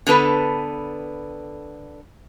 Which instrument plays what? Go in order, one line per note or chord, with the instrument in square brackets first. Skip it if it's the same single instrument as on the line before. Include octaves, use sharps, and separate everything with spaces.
[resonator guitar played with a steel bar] D3 B3 A4 B4